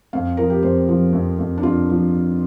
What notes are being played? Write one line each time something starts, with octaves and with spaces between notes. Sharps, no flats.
F2 F5
F3 A#4
G4
F2 C5
F3
F2
F2
D4
F2 F4
F3